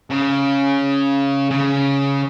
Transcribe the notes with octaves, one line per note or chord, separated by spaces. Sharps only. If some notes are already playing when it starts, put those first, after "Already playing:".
C#3
C#3